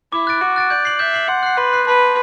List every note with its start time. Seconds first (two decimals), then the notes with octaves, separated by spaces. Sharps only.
0.12 E4 D6
0.27 F#6 A6 D7
0.41 F#4 D6
0.56 F#6 A6 D7
0.70 D5 G6
0.85 C7 F#7
0.99 E5 G6
1.14 C7 F#7
1.28 F#5 C6
1.43 F#6 C7
1.57 B4 C6
1.73 F#6 C7
1.87 B4 A5
2.01 C6 F#6